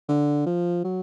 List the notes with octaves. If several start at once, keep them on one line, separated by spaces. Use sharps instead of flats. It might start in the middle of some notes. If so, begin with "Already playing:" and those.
D3
F3
F#3